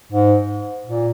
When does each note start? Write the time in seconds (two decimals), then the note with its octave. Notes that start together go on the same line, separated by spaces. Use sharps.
0.12 G#2
0.86 A#2